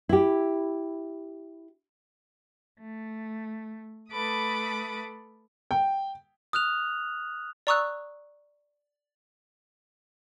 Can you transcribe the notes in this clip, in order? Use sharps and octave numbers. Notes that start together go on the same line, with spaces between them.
E4 G4
A3
A3 A4 B4 B5 D6 D#6
G5
D#6 F6 F#6 F7
D5 A#5 C#6 D#6 E6 F#6